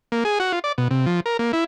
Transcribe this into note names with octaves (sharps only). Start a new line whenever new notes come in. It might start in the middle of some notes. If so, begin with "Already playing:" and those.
A#3
G#4
F#4
F4
D5
B2
C3
F3
A#4
A#3
E4